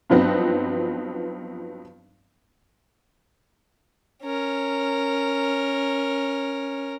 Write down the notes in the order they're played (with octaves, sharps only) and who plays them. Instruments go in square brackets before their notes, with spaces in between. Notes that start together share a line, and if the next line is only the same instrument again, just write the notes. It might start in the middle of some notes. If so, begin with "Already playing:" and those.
[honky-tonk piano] G2 F3 F#3 B3 C4 D#4
[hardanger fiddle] C#4 A#4